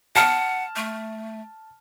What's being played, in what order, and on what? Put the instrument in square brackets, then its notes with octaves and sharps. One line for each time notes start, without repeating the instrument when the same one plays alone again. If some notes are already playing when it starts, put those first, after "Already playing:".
[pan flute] F#5 [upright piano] A5 F6
[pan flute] A3